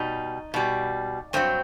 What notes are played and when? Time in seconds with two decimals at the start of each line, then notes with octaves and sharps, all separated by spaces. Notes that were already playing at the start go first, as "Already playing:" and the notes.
Already playing: B2 G3 D#4
0.54 B2 G3
1.33 G2 F#3 C4